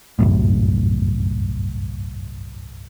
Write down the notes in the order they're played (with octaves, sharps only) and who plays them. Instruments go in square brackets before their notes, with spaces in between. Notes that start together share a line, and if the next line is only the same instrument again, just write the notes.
[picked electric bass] G1 C2 F#2 A2